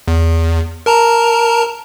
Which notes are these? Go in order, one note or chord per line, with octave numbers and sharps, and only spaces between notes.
E2
A#4 A5 A#5